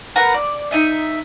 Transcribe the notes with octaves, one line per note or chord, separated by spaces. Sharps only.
A#4 B4 F#5 A#5
D5
D#4 D#5 E5